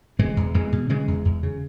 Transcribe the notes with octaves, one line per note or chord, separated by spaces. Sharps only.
B2 E3 G#3
E2
E2 E3 G#3
B2
C#3 E3 G#3
E2
E2
C#3